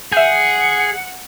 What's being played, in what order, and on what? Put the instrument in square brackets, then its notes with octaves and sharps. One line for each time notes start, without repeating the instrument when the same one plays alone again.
[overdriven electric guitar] G#4 [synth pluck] E5 G6 [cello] F#5